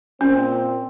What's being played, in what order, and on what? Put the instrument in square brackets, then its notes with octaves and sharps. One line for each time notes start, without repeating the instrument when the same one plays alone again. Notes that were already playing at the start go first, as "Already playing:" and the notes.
[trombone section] A#2 C4 [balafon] C#4